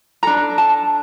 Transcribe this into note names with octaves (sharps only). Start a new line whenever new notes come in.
D4 A4 A#5
A5